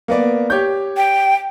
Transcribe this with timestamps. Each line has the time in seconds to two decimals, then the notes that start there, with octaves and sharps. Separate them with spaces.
0.08 A#3 B3 D5
0.50 G4 C#5 G6
0.97 G5